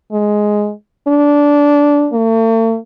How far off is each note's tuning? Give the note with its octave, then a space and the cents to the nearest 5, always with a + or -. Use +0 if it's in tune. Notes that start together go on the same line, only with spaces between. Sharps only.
G#3 +5
D4 -15
A3 +45